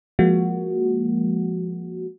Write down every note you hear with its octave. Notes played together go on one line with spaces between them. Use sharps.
F3 G#3 A#3 F#4